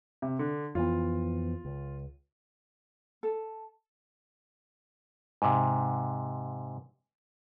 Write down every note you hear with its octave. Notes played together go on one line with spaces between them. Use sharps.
C3
D3
F2 E3 B3 F4
C#2
A4
G#2 C3